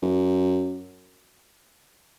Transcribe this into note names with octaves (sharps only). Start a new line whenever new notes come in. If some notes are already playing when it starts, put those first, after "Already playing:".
F#2